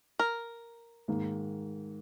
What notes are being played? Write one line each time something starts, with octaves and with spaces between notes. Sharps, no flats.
A#4
G#2 D#3 A#3